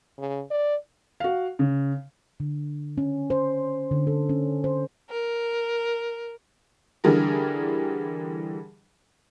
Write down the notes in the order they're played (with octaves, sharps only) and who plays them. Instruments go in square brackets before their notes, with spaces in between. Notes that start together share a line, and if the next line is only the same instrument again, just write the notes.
[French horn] C#3
D5
[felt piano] F#4 F5
C#3
[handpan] D3
C#4
C5
D3
A4
C#4
C5
[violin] A#4
[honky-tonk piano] D3 E3 G3 G#4 A#4